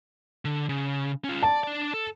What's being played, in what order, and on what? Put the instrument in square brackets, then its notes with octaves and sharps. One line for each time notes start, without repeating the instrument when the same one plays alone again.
[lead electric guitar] D3
C#3
C#4 F4
[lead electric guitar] D5 [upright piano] A5
[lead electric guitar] D4 D5
A4